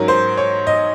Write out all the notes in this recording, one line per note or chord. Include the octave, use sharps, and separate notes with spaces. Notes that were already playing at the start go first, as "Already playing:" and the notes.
Already playing: G#2 F#3 C#4 A#4
C5
C#5
D#5